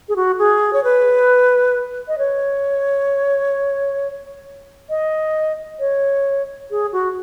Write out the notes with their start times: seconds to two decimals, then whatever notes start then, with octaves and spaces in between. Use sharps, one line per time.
0.09 G#4
0.16 F#4
0.39 G#4
0.73 C#5
0.84 B4
2.08 D#5
2.18 C#5
4.90 D#5
5.79 C#5
6.71 G#4
6.92 F#4